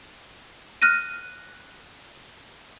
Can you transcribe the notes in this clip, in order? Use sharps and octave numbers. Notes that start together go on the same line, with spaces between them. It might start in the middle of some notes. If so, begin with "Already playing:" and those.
F6 F#6 A#6 D#7